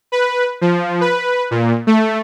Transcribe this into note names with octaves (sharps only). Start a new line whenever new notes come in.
B4
F3
B4
A#2
A3